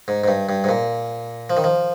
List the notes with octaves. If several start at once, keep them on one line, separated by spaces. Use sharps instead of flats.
G#2
G#2
G2
G2
G#2
A#2
F3
D#3
F3